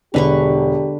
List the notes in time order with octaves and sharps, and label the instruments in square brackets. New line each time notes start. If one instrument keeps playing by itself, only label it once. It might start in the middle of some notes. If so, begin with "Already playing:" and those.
[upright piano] E1 [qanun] D3 B4 C#6 [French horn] G4